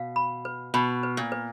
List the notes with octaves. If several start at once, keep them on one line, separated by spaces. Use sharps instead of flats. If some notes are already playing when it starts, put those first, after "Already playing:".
Already playing: B2 F5
B5
B4
B2 B5
B4
A#2
B4